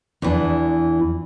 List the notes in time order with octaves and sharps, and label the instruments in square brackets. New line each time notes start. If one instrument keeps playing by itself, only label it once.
[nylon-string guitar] E2 E3 D4